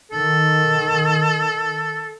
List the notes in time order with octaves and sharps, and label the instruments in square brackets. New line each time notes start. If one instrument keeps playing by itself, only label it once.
[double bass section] D#3 [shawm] A4